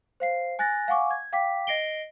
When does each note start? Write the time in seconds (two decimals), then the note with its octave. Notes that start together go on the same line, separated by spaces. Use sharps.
0.20 C5 F5 C7
0.59 G#5 F#6 A6 A#6
0.88 F5 F#5 G#5 C#6 D6
1.11 G#6
1.33 F5 G5 D6 B6
1.67 D#5 A#6 C7 D7 G7